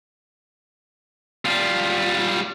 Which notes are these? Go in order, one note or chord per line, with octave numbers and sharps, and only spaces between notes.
G3 F4